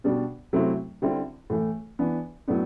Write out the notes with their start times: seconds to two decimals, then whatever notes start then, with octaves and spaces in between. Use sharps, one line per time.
0.04 B2 G3 D4
0.53 C3 F#3 A3 C4 E4
1.02 D3 G3 C4 E4
1.50 A2 E3 A3
1.99 E3 B3 D4
2.48 A2 F#3 B3 D4